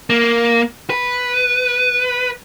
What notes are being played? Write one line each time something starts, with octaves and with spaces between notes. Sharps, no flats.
A#3
B4